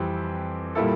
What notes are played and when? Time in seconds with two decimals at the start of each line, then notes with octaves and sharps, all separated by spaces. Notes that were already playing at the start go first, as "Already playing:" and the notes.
Already playing: F2 E3 G3 C4 G4
0.75 A#2 G3 A#3 E4 A4